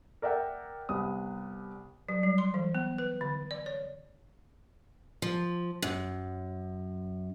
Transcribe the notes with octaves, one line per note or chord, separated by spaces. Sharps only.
A#4 D5 E5 F#5 G5
C2 C3 B3 D#6
F#3
G3
C6
E3
B3
B4
D3
D5
C#5
F3
F#2